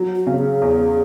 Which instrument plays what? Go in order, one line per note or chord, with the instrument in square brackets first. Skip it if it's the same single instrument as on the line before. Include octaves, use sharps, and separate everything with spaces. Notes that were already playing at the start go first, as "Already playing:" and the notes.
Already playing: [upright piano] F#3
[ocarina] F#4
[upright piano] C#3
[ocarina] G#4
[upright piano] E2